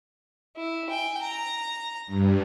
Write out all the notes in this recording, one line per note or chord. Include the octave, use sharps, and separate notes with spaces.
E4
G5 G#5
A#5
G2